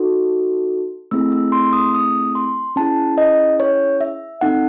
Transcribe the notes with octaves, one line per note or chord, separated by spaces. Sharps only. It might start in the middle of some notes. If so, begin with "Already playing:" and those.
Already playing: D#4 F#4 A4
A3 C4 E4 G#4 E6
E6
C6
D#6
D#6
C6
C#4 E4 G#4 A5
D#5
C#5
E5
C4 D#4 A4 F#5